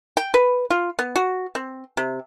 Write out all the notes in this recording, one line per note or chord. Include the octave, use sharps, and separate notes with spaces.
G5
B4
F4
B3
F#4
C4
C3